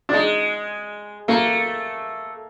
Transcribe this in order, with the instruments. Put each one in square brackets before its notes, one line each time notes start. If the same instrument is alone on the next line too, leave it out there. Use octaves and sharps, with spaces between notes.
[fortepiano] D4
[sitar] G#3 [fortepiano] D#4
[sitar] A3 [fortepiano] A#3